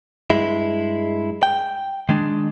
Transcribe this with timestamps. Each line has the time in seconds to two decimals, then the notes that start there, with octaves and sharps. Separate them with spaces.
0.30 G2 G#3 E4
1.43 G5
2.09 D#3 G#3 D4